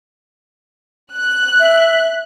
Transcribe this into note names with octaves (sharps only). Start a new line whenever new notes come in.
F#6
E5